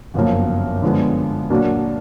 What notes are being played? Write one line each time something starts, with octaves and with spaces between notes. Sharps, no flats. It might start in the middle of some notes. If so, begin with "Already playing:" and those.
G1 F#2 C#3 F3 A#3
D3 F3 G#3 B3
A#2 F#3 A#3 D4 F#4